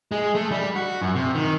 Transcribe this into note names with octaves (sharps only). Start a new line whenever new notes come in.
G#3
A3
G3
F#4
F#2
C3
D#3